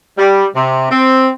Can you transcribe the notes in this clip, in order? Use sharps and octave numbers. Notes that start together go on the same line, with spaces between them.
G3
C3
C4